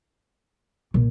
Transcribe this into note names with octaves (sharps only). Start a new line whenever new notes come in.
A#2